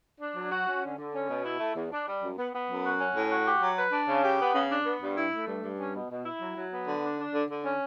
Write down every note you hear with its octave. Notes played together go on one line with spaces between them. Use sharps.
D4
F#3
F#4
C#4
D3
D3
C#4
B2
E4
A3
E2
D4
G3
F#2
B3
B3
F#2
F#4
C#4
A2
F#4
G4
F#3
B4
D4
C#3
G4
B3
C#3
D4
B3
G2
E4
A3
G2
G2
C#4
B2
B2
E4
F#3
F#3
B3
D3
D4
D4
D3
D3
C#4